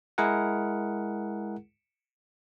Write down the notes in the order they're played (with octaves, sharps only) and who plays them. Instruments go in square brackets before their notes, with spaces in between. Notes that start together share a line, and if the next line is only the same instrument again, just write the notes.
[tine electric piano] G#3 E4 G#4 A#4 F#5